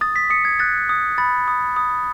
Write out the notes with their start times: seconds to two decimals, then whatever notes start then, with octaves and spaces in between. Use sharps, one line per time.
0.01 D#6 A6
0.16 B6
0.30 D#6 C#7
0.45 G#6
0.60 F#6 A6
0.89 D#6
1.18 B5 A6
1.48 D#6
1.76 D#6